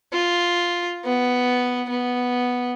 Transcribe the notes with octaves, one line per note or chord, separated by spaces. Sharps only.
F4
B3
B3